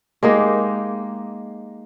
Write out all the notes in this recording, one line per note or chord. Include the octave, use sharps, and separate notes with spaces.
G#3 A#3 D#4 G4